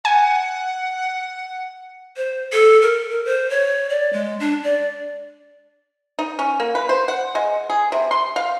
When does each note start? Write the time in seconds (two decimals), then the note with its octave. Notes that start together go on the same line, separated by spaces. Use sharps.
0.05 F#5 G#5
2.17 C5
2.52 A4
2.81 A#4
3.09 A#4
3.25 C5
3.50 C#5
3.89 D5
4.13 G#3
4.40 D4
4.63 D5
6.19 D#4
6.39 C#4
6.60 A#3
6.75 B4
6.89 C5
7.08 F#5
7.35 G#3
7.70 G#4
7.92 C3
8.11 C6
8.36 F5